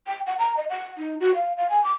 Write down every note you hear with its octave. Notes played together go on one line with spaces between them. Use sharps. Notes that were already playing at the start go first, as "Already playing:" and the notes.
G5
F#5
A#5
D#5
F#5
D#4
F#4
F5
F5
G#5
D6